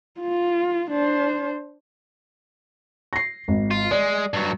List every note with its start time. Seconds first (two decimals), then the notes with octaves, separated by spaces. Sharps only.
0.20 F4
0.91 D4 C5
3.13 A#6 C7
3.48 G#1
3.71 F4
3.91 G#3 D5
4.33 G2 F#3